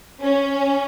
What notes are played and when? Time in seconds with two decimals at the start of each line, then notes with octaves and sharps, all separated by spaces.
0.21 C#4